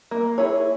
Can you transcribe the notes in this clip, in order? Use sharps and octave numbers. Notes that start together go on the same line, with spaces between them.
A#3
E4 G#4 C#5